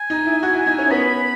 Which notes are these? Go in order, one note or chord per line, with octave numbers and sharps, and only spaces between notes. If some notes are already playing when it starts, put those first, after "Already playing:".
Already playing: G#5
D#4
E4
F#4
E4
D#4
C#4
B3 B5